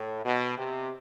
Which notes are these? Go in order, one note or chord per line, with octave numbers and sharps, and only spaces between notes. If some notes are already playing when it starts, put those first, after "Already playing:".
Already playing: A2
B2
C3